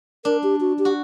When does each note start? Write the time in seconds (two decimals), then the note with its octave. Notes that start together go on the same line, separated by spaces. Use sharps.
0.25 D4 A#4
0.43 G4
0.61 F#4
0.79 G4
0.85 F#4